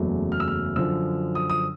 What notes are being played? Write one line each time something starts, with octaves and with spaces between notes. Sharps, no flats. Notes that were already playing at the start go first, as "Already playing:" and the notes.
Already playing: F#1 E2 C#3 F#3 A3
F6
E6
F6
F#2 D3 F3 E6
D#6
D#6